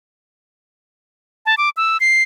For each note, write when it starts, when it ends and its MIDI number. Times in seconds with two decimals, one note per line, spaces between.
1.46 1.55 81
1.58 1.70 86
1.77 1.97 88
2.00 2.23 96